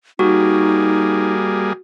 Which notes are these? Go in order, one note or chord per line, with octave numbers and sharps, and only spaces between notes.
G3 A#3 D#4 F#4 G#4